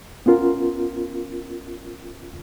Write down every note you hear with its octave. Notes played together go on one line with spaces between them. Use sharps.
B3 C#4 F4 A#4